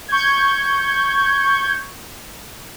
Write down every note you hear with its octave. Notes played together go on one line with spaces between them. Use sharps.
C#6 G6 G#6